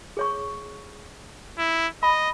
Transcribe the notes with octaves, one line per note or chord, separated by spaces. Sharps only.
G#4 C#5 C#6
E4
D#5 B5